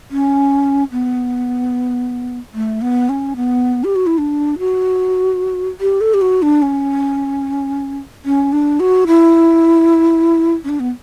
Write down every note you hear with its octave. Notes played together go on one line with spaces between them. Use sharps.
C#4
B3
A3
B3
C#4
B3
G4
F#4
E4
D4
F#4
G4
A4
G4
F#4
D4
C#4
C#4
D4
F#4
E4
C#4
D4
B3